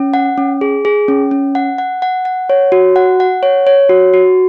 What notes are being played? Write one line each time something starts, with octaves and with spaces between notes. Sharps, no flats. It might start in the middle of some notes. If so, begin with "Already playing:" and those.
Already playing: C#4
F#5
C#4
G#4
G#4
C#4
C#4
F#5
F#5
F#5
F#5
C#5
F#4
F#5
F#5
C#5
C#5
F#4
F#4